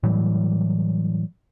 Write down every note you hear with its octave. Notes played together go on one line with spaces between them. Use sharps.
A2 E3 F#3 G3